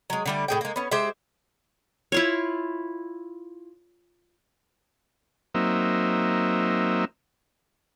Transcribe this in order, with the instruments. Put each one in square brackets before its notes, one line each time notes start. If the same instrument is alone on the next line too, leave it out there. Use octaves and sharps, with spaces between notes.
[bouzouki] F#3 G#3
D3 G3 A3
A2 G#4 G5
G#3 A#3
B3 C#4
G#3 G4 C5 E5
[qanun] E4 F4 C#5
[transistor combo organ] F#3 A#3 C4 D#4 E5